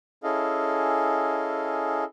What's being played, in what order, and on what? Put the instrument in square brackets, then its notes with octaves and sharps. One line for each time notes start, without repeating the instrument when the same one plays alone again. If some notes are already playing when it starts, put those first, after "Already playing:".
[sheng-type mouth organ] C#4 E4 G#4 A4 D#5 F5